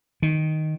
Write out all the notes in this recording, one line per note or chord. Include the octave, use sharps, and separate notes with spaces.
D#3